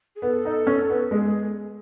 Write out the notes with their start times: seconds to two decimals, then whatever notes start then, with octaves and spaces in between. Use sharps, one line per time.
0.15 G#4
0.22 B3 A4
0.45 D#4
0.67 C#4
0.90 B3
1.11 G#3 G#4